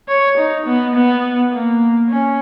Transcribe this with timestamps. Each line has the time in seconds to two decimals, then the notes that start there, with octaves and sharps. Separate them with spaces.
0.08 C#5
0.37 D#4
0.67 B3
0.95 B3
1.52 A#3
2.10 C#4